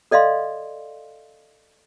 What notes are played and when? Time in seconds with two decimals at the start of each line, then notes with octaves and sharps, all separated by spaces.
0.11 A4 D5 D#5 F5 C6